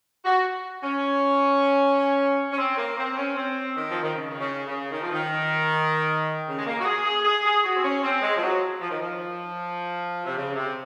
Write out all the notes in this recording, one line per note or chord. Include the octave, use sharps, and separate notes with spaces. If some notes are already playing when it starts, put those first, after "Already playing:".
F#4
C#4
C#4
C4
A#3
C4
C#4
C4
D#3
F3
D#3
C#3
D#3
C#3
C#3
D#3
F3
D#3
C#3
G#3
A#3
F#4
G#4
G#4
G#4
G#4
F#4
C4
C#4
C4
G#3
F3
F#3
F3
D#3
F3
C3
C#3
C3